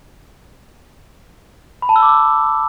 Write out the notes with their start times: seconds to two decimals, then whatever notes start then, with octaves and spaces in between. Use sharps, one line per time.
1.82 B5
1.89 A5
1.96 E6
2.02 D6
2.09 E6